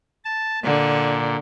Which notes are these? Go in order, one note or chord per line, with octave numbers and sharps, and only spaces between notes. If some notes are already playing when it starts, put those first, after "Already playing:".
A5
A#2 D3